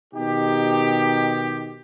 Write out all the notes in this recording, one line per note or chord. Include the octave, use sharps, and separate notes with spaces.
B2 D#3 D#4 G4